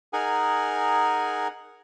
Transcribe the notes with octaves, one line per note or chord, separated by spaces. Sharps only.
D#4 G#4 A#4 F#5 G#5